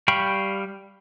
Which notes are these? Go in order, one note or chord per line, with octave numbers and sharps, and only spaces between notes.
G3 F5 G5 B5 C#6